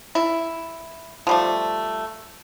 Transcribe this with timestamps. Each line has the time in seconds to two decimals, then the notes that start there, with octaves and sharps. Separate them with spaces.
0.15 E4
1.27 F3 G3 A3